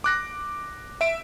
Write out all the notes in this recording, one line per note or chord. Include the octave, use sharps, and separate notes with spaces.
D6 F#6 A#6
E5 D7